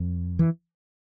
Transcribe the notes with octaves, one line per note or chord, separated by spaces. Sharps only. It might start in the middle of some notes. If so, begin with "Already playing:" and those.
Already playing: F2
E3